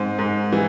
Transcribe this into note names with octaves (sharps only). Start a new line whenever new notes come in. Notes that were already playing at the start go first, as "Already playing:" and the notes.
Already playing: G#2 C4
G#2
E3